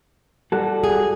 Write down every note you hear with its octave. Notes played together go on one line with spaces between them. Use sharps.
G3 F#4 A4
G#4